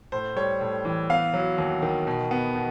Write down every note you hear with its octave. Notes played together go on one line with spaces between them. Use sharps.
A2 C5
G3 C#5
A2
E3
B3 F5
F#3
D#2
D#3
B2
B3
B2